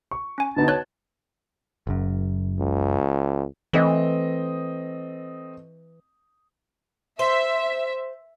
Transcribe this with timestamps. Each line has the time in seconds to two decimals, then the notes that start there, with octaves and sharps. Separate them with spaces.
0.11 C#6
0.38 C#4 G#5
0.56 B2 D3 B3 D#4 A5
0.68 C#5 F#6 G#6
1.87 F#1 F#2
2.59 C#2
3.73 E3 A3 C4 D#5
7.19 C5 E5